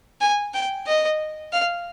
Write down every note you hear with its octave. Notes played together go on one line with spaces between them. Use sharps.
G#5
G5
D#5
F5